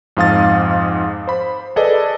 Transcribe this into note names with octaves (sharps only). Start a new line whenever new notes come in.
F2 G#2 F5 D#6 A6
C5 B5
G#4 A4 B4 D5 D#5 A5